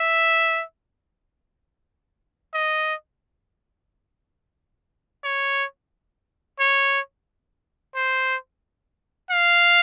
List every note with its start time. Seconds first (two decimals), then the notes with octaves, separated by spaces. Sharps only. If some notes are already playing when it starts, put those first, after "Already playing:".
Already playing: E5
2.54 D#5
5.24 C#5
6.60 C#5
7.95 C5
9.31 F5